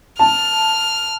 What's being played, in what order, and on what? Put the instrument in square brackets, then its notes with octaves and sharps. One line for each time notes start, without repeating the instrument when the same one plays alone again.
[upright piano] A5 [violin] F6